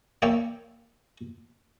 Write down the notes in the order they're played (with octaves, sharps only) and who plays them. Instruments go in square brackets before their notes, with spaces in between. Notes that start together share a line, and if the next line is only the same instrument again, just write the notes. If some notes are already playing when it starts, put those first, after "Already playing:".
[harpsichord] A#3 C#5 D5 E5 G5